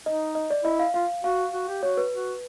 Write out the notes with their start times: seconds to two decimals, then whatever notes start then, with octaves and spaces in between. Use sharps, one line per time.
0.06 D#4 D#5
0.35 D#5
0.50 D5
0.64 E4 D#5
0.79 F5
0.94 F4 F5
1.24 F#4 F5
1.53 F#4
1.69 G4
1.83 F#4 C#5
1.97 B4
2.13 F#4